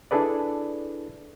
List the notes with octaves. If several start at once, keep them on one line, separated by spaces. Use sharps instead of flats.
D4 E4 G#4 A4 B4 D5